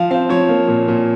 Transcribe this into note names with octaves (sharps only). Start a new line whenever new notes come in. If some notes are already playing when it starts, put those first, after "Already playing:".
Already playing: F3 F5
C4 F5
F3 C#5
A#3
A#2
A#2